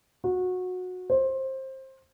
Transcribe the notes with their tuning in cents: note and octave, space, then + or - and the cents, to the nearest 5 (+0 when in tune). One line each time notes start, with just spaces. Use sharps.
F#4 -20
C5 +20